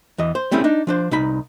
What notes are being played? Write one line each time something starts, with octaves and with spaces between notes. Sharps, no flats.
E2 E3 D#5
C5
G3 A3 C4 C#4 E4 G#4
D4 D#4
F3 D4 C5
C2 D#4 B5